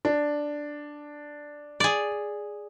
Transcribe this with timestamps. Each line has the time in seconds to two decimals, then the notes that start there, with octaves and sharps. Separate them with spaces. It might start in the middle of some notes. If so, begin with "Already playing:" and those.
0.05 D4
1.80 G#4 D5